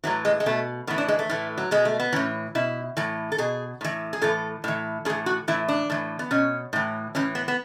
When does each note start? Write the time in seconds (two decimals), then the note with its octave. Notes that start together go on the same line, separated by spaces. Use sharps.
0.04 A2 E3 F#3
0.25 G#3
0.40 G#3
0.46 B2 A3
0.87 A2 E3 B3
0.98 D4
1.08 G#3
1.19 A3
1.29 A2 E3
1.58 F#3
1.71 B2 G#3
1.85 A3
2.00 B3
2.13 A2 E3 C#4
2.55 B2 E4
2.97 A2 E3
3.32 A4
3.38 B2 G#4
3.81 A2 E3
4.13 G#4
4.22 A2 E3 A4
4.64 A2 E3
5.05 A2 G#4
5.10 E3
5.26 F#4
5.48 A2 E3 E4
5.68 D4
5.90 A2 E3
6.19 B3
6.31 B2 C#4
6.73 A2 E3
7.15 A2 E3 C#4
7.35 B3
7.48 B3